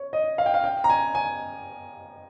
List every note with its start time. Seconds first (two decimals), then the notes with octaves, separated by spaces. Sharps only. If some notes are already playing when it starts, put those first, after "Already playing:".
Already playing: C#5
0.13 D#5
0.38 F5
0.46 G5
0.54 F5
0.64 G5
0.84 A#5
0.90 G#5
1.15 G#5